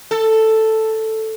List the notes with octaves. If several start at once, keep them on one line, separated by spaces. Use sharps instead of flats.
A4